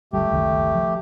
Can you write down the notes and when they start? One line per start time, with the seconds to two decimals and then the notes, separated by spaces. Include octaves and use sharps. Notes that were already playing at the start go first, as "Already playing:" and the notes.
0.13 D1 G1 G3 A3 G4
0.30 F#1 C#2 D#3
0.75 F3